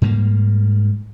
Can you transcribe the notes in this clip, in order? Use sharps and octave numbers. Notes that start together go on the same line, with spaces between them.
G#2 G3 A#3